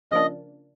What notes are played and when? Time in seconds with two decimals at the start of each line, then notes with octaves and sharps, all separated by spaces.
0.11 C#3 F3 A#3 D4 D#5